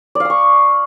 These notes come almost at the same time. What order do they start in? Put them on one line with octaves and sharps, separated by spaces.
D5 F5 D#6 C#6